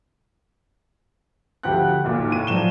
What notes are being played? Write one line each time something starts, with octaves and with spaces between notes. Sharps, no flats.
D2 F3 G4 F#5 F#6
F1 B1 A#2 D#3
A2 D#7
F3 F#3 D5 E7 G7